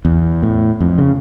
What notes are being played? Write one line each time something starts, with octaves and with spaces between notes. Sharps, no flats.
E2
A2
F2
C#3